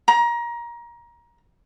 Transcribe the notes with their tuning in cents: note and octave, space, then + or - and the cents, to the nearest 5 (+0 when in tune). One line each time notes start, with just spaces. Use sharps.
A#5 +25